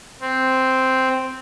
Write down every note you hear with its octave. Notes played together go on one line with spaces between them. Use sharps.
C4